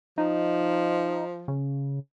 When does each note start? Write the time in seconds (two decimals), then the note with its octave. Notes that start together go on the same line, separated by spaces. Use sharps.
0.18 F3 D#4
1.48 C#3